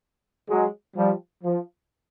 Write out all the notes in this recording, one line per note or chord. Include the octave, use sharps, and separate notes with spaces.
F#3 G#3
F3 G3
F3